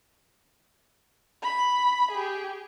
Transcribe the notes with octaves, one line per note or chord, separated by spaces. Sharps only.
B5
G4 G#4